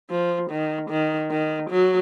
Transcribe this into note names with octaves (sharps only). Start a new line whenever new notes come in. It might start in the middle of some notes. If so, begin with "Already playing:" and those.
F3
D#3
D#3
D#3
F#3